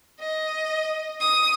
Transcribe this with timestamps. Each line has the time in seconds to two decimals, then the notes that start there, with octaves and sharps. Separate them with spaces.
0.20 D#5
1.21 D#6